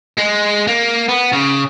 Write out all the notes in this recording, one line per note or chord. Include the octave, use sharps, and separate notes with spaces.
G#3
A#3
B3
C#3